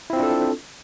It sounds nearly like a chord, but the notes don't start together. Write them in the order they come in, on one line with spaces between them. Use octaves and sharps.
E4 C4 F4 D4 A4